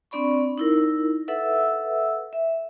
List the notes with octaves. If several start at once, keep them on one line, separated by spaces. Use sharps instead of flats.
C4 D4 D5 B5 C#6
D#4 E4 A#4
A4 B4 E5 F#5 E6
E5